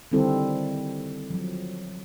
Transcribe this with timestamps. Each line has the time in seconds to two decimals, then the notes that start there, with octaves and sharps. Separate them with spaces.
0.12 D3 D#3 G3 C4 E4 A4
1.30 F3 F#3